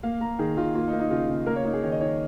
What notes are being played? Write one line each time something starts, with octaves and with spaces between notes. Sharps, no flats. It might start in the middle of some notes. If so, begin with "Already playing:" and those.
A#3 F5
A#3 A#5
D#3 G#4
D#3 F4
A#3 F4
D#4
A#3
D#4
C#3 F4
C#3
A#3 A#4
C#5
A#3 D#4
G#4
D#3 C#5
D#5
D#3 C#5